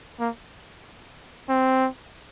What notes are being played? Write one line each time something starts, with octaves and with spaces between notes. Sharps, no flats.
A#3
C4